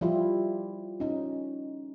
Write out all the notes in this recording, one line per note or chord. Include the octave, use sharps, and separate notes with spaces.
F3 G3 E4 F4 G4
C#4 D#4